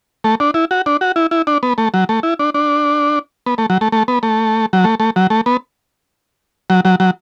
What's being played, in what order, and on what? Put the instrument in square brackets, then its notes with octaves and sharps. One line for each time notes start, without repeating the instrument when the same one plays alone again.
[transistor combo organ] A3
D4
E4
F#4
D4
F#4
E4
E4
D4
B3
A3
F#3
A3
E4
D4
D4
B3
A3
F#3
A3
A3
B3
A3
F#3
A3
A3
F#3
A3
B3
F#3
F#3
F#3